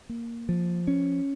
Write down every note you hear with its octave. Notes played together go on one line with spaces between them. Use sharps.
A#3
F3
C#4